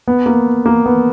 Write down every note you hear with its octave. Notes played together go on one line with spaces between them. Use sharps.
B3
A#3
A#3
B3